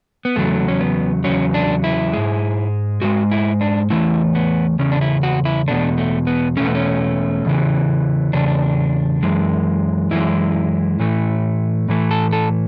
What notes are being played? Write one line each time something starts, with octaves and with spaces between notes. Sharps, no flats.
B3
E2 C#3 F#3 A3
C#4
B3
E2 C#3 F#3 C#4
D4
E4
G#2 G#3
G#2 G#3 F#4
E4
D4
E2 C#3 E3 A3 E4
B3
E2 C#3 C#4
D4
E4
F#4
E4
E2 B2 A3 D4
A3
B3
E2 B2 A3 C#4
B3
C#4
E2 C#3 E3
E2 C#3 D4
F#2 E3 G#3
F#2 E3 G#3 E4
A2 E3 A3
A2 E3 A3
A4
A4